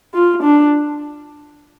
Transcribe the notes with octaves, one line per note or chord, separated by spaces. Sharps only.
F4
D4